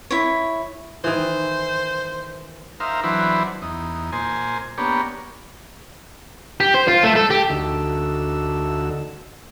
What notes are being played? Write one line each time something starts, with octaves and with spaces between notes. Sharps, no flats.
E4 C#5
D#3 E3 C5
D#4 A#4 C5 E5 F5
E3 F#3 D4 E4 B4 C5
E2 D#4
A#2 C5 G#5
A#3 B3 D4 G4 C#5
G4
C5
F4
A3
A4
G4
D2 D3 D#4 F#4 A4 E6